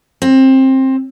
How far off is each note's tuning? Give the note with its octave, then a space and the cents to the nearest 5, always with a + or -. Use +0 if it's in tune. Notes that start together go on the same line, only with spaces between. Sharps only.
C4 +20